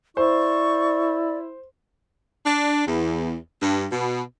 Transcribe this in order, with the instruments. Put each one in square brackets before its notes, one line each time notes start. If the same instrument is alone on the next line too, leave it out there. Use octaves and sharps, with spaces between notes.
[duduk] E4 [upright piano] C5 [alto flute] D5 [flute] C#6
[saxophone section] D4
E2
G2
B2